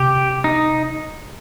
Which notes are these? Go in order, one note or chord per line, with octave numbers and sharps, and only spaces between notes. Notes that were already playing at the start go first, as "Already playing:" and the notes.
Already playing: C3 G4
D#4